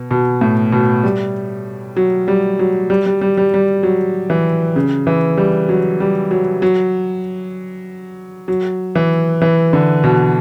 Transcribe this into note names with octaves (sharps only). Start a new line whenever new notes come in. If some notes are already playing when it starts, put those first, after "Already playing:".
Already playing: B2
B2
A2
B2
G3
F#3
G3
F#3
G3
G3
G3
G3
G3
F#3
E3
C#3
E3
G3
F#3
G3
F#3
F#3
F#3
E3
E3
D3
B2